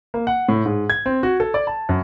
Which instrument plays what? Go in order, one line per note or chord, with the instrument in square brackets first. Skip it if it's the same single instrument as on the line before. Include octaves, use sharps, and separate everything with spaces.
[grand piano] A#3
F#5
A2
G#2
G#6
C4
F#4
A4
D5
A5
F#2